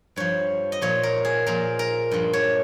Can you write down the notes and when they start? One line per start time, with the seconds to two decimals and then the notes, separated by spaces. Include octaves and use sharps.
0.16 G2 F3 C#5
0.72 D#5
0.81 A#2 F3 C#5
1.03 A#4
1.25 G#4
1.46 A#2 F3 A#4
1.79 A#4
2.11 G2 F3
2.33 C#5